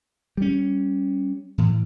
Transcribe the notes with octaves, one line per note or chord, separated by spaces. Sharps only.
G3 C#4
A2 E3